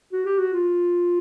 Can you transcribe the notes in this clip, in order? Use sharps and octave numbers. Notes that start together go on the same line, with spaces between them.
F#4
G4
F#4
F4